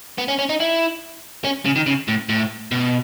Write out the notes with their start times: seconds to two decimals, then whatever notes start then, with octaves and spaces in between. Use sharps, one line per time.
0.18 B3
0.28 C#4
0.39 C#4
0.49 D#4
0.60 E4
1.45 C#4
1.65 C#3
1.76 D#3
1.87 C#3
2.08 A2
2.29 A2
2.72 B2